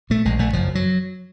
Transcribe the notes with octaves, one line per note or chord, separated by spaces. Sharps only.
A#2 A3
A#1 G#3
A#1 A3
F#1 F3
F#2
F#3